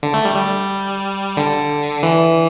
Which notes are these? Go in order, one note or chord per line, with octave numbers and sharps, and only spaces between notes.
D3
A3
G3
G3
D3
E3